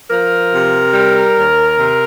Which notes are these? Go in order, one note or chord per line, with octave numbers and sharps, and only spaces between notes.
F3 A#4
C3
G3
D#2
C3